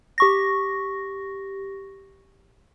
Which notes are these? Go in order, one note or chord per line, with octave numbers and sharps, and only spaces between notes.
G4 C#6 A#6